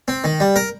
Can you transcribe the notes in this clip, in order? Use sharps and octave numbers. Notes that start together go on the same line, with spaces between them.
C4
D#3
G3
A#4